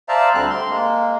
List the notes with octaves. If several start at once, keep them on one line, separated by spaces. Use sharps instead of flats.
C5 D5 E5 F5 A5 A#5
D2 D3 G3 C4 F6 F#6
C6
G#3 A#3